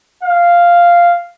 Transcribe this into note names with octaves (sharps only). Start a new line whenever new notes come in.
F5